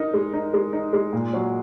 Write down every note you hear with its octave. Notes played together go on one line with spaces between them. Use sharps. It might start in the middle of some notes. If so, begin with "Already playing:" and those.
Already playing: D#4 A#4
G#3
D#4
G#3
D#4
G#3
A#2
F#3